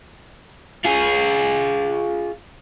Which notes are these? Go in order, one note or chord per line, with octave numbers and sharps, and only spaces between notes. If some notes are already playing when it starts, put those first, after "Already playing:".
F4 G#4